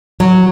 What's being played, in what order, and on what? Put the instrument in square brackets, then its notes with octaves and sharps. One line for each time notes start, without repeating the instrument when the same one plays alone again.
[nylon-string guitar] F#3